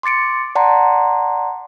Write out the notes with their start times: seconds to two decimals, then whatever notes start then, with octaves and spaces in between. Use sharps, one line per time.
0.03 C6 D6 A6 C#7 D7
0.55 D5 F#5 A5 A#5 C6